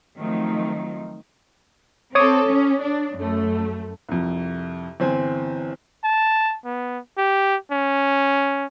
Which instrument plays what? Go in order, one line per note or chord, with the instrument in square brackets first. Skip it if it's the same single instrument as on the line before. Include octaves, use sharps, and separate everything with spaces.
[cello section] D#3 F3 F#3 A3 C4 D#4
[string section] C4 A4 [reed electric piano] C#5 D6 D#6
[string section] C#4
D4
F#2 A3
[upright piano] C2 F2
G1 E3 C4 C5 G#5
[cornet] A5
B3
G4
C#4